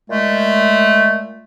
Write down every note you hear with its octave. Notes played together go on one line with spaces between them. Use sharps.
A#2 G#3 A3